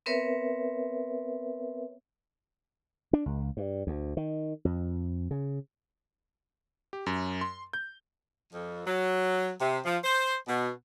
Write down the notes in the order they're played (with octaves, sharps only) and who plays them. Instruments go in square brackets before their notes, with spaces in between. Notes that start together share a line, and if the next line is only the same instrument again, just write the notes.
[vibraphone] B3 C4 A#4 B4 C#5 E5
[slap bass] D4
C#2
G2
D2
D#3
F2
C#3
[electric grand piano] G4
F#2
C6
G6
[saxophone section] F2
F#3
C3
F3
C5
B2